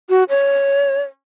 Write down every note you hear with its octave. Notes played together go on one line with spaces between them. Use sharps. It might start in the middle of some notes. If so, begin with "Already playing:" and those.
F#4
C#5